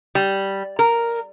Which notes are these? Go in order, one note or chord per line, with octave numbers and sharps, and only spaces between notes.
G3
A#4